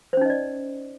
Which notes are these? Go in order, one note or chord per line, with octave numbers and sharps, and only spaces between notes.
C#4 D#4 C5 D5 D#5